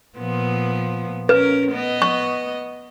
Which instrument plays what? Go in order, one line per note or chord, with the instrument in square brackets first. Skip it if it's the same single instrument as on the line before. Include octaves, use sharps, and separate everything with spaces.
[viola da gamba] A#2 F3 B3
[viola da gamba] C#4 A#4 [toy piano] B4
[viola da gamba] B3 D#5
[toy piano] C#6